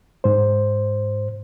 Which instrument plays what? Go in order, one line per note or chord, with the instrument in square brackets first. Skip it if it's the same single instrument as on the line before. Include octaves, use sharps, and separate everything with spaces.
[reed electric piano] G#2 C5